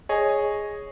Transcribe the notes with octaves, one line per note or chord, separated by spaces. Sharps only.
G#4 C#5 D#5